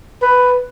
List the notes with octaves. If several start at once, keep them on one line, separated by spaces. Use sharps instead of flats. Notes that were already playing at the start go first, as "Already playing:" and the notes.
B4